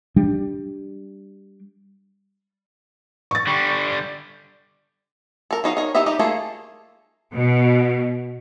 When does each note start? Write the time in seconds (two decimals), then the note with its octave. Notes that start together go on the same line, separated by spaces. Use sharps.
0.16 G3 D4
3.31 C#6 A6
3.47 D3 G3
5.51 A4 A#4
5.64 F#3 D#4 D#5 F5
5.77 D#4 A#4 C#5
5.95 D#4 E4 G4 D#5 E5
6.06 G3 D#4 G4 D#5
6.19 A3 A#3 F4 G#4 A4
7.34 B2